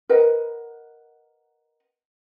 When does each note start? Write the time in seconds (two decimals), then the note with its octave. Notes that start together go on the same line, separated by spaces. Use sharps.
0.09 A#4 B4 D#5 F#5